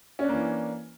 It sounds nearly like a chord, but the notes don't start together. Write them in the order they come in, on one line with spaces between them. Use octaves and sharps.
C#4 D4 A#3 E3